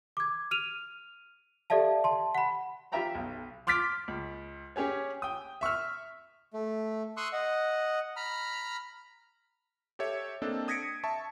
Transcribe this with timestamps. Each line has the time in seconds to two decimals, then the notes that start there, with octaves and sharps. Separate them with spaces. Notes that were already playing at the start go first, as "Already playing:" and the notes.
0.17 D6 G#6
0.51 F6 D#7 F7
1.70 G4 A4 D5 E5 F5 A5
2.04 A5 C6
2.35 F#5 B5
2.92 F4 G4 E5 G5 A#5 B5
3.15 B1
3.67 C6 D6 F6 A6 B6 D7
4.08 C#2
4.76 C#4 G4 G#4 C#5
5.22 G5 D#6
5.61 E5 C#6 E6 F6
6.54 A3
7.17 C6 C#6 D#6 E6 F#6
7.33 D#5 F#5
8.16 A#5 B5 F6
9.99 G4 A4 C#5 E5
10.42 A#3 C4 D4 A4 D#5
10.68 D#6 G#6 A#6 B6 C#7 D7
11.04 E5 A5 C#6